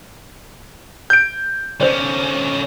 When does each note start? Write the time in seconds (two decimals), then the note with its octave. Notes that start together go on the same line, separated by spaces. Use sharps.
1.10 G6 D7
1.81 D3 C#4 C5 D5